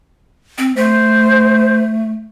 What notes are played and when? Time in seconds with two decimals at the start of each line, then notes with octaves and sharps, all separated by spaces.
0.58 C4
0.76 A3 C5